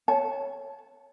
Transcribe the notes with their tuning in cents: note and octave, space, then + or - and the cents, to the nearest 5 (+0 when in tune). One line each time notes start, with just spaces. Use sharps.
C#5 +0 A5 -15